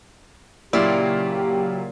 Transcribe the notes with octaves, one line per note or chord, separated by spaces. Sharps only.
A#2 C#3 F#3 A#3 E4 F4 G4 D5